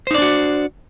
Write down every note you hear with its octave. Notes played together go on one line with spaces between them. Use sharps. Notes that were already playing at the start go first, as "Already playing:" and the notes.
D4 D#4 F#4 C5 D5